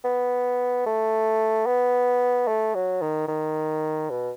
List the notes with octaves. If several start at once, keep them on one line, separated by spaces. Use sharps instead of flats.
B3
A3
B3
A3
F#3
D#3
D#3
B2